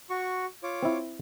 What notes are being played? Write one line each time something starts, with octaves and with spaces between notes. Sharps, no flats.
F#4 C#6
F4 C#5 D6
C4 E4